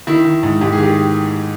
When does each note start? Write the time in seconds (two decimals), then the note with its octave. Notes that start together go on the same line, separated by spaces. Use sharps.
0.07 D#3 E4
0.25 D#3
0.43 G#2
0.61 G#2 G4
0.72 G#4
0.78 D#3 G4